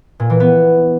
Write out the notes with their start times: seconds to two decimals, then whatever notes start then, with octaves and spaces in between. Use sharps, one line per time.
0.20 A#2
0.30 E3
0.40 B3